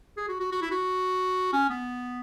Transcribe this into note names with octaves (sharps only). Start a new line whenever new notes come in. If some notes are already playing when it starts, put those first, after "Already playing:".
G#4
F#4
F#4
F#4
E4
F#4
C#4
B3